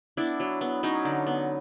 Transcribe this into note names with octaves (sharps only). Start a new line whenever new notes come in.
B3 D4 E4
F#3
B3
F#3 C#4 D#4
D3
B3